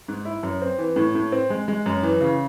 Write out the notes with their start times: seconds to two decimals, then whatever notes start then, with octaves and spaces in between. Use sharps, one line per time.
0.08 G#2
0.25 E4
0.43 F#2
0.62 C4
0.78 E3
0.96 A2
1.15 A2
1.32 C4
1.50 G#3
1.68 G#3
1.86 F#2
2.03 E3
2.21 C#3